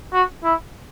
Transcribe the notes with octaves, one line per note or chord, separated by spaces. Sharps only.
F#4
E4